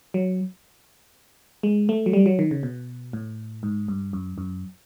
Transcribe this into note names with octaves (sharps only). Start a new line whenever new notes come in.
F#3
G#3
A3
F#3
G3
F#3
D#3
C#3
B2
A2
G#2
G2
F#2
F#2